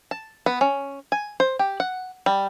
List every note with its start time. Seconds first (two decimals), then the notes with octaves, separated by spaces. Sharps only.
0.11 A5
0.46 B3
0.61 C#4
1.12 G#5
1.40 C5
1.59 G4
1.80 F#5
2.26 G3